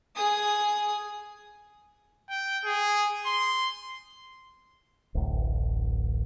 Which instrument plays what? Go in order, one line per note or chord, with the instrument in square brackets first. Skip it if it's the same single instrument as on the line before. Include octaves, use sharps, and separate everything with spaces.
[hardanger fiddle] G#4 D#6
[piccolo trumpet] G5
G#4
C6
[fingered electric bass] D1 A1